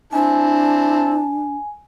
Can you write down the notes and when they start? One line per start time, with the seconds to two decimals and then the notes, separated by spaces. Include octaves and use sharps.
0.13 C4 D4 E4 G#5 A5